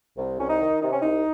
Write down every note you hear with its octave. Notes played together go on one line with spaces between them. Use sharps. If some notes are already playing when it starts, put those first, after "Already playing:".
C2
C2 C#4
D#4
D#3
C3 D#4
C#4
C2 D#4